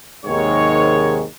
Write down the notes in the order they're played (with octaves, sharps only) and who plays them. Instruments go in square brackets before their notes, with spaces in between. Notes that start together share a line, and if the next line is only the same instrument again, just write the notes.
[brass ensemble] D#2 G#2 C3 D#3 G#3 C#5